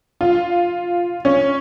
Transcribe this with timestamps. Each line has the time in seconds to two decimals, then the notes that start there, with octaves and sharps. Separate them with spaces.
0.21 F4
1.25 C#4